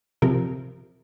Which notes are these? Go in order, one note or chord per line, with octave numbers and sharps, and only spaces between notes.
C3 F3 C4 A#4